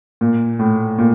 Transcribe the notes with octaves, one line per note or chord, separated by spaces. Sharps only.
A#2
A2
A#2